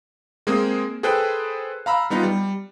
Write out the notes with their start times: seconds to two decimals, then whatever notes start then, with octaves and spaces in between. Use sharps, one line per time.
0.47 G#3 A#3 C4 G#4 C5
1.03 G#4 A4 B4 C5 G5 F#6
1.86 F5 A#5 B5 E6
2.10 G3 B3 D#4 F4
2.23 G3